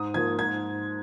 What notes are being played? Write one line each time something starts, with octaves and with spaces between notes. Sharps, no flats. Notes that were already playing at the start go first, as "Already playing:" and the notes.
Already playing: G#2 D#6
F3 A#3 G#6
G#2 G#6